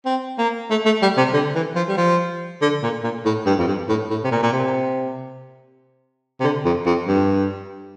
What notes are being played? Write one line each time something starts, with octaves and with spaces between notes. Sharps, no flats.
C4
A#3
A3
A3
G3
C3
D3
E3
F3
G3
F3
D3
A#2
A#2
A2
G2
F2
G2
A2
A2
C3
A#2
A#2
C3
C3
D3
F2
F2
G2